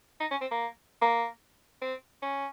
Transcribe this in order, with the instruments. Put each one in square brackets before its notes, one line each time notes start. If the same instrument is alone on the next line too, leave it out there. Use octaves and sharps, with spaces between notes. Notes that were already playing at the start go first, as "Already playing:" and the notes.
[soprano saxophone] D#4
C#4
C4
A#3
A#3
C4
C#4